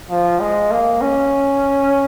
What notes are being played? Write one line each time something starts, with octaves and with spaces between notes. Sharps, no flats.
F3
G#3
A#3
C#4